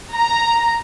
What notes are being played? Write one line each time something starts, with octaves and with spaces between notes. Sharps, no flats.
A#5